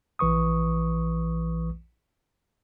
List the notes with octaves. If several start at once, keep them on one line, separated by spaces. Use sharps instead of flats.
A#1 E3 B4 C#6 D#6